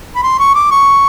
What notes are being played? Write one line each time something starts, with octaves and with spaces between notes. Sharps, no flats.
B5
C6
C#6
D6
C#6